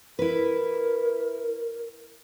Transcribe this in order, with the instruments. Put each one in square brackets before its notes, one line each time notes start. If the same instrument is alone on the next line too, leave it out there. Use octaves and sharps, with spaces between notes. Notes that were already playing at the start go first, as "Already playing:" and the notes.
[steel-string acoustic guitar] E4 B4 [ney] A#4